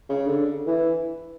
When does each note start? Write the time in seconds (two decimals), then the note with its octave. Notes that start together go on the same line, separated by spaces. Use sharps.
0.09 C#3
0.27 D3
0.67 E3